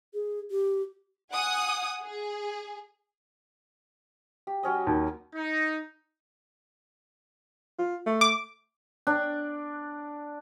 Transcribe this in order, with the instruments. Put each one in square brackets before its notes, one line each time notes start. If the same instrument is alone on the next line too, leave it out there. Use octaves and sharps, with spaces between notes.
[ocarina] G#4
G4
[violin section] F#5 G#5 D#6
G#4
[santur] G4
F#3 C#4 D#5
[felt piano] D#2
[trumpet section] D#4
[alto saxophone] F4
A3
[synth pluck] D6
[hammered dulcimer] D4